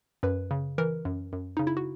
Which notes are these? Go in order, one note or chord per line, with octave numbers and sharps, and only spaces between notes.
F#2 B4
C#3
E3 A#4
F#2
F#2
C#3 D#4
E4
F#4